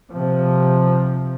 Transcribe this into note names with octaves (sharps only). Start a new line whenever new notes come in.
C3 F3